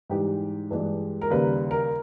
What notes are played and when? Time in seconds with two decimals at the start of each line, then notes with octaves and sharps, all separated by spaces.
0.10 G#2 E3 G3 G4
0.70 G2 E3 G#3
1.21 A#4
1.30 D#2 C#3 G3 B4
1.71 A#4